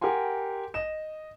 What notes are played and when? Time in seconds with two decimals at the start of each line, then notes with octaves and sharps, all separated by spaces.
0.01 G4 A#4 F#5 G#5 C6
0.74 D#5 E7